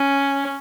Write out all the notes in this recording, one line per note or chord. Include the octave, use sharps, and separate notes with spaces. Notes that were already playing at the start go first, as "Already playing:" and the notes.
Already playing: C#4